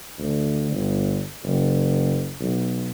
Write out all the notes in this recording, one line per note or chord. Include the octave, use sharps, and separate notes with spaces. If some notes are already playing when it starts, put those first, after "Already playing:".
D2
G1
F#1
B1